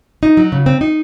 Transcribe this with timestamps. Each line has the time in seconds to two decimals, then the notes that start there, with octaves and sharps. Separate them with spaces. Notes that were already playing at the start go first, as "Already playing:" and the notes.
0.23 D#4
0.37 F#3
0.52 C#3
0.66 C4
0.81 D#4